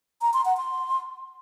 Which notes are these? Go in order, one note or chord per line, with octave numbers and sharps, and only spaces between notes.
A#5
C6
F#5
C6